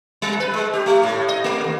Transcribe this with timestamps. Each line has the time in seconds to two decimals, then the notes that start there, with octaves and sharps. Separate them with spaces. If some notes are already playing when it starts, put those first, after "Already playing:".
0.22 G3
0.40 B4
0.54 G#3
0.73 G4
0.86 A3
1.04 A2
1.28 D#5
1.44 A3
1.64 D#2